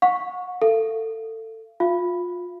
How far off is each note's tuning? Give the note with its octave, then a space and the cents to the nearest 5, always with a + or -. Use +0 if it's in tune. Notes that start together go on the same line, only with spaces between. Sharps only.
F#5 -45 C#6 +0
A4 +20 F5 -40
F4 +25 F5 -40